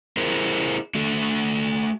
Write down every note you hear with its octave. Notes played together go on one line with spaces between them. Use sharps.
E4 G#4 A#4 C5
A3 F#4 A4